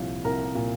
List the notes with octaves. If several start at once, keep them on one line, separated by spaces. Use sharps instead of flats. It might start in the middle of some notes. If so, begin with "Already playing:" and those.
Already playing: C2 A#2 F3 C#5
C2 A#4 A#5
A#2